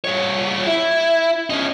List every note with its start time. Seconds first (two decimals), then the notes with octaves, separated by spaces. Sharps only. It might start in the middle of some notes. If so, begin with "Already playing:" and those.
0.04 G3 C#5
0.66 E4
1.50 C#4 D#4